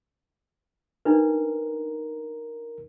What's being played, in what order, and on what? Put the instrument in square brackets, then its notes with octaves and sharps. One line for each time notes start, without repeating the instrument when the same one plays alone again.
[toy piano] D4 D#4 B4 [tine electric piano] A#4